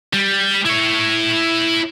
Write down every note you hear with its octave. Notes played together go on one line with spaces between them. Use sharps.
G3
E4 C#5